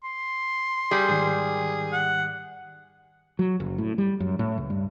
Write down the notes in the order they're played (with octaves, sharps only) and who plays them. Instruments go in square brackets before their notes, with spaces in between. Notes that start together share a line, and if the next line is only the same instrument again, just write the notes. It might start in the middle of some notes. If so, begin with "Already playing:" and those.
[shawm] C6
[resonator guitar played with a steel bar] G3 [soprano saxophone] G#4
[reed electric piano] G#2 D#3 [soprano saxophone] G#4
[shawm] F#5
[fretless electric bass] F#3
F#1
A2
G3
F#2
A2
C#2
G2